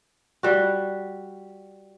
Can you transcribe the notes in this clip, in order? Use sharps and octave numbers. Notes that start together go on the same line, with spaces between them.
G3 F#4